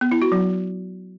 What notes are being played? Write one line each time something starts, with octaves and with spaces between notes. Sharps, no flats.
B3
E4
F#4
F#3